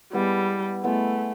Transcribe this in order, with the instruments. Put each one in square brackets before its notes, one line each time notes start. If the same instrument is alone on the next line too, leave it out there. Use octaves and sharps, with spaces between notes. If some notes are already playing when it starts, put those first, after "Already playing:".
[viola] G3 [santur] G#3 B3 E4
[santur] G#3 B3 E4 [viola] A3